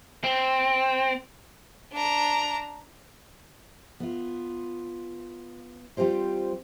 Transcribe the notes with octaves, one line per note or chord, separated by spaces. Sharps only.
C4
D4 A#5
B3 F4
G3 C4 F4 G4 C5